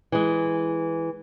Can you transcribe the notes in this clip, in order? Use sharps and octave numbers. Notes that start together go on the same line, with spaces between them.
E3 G#3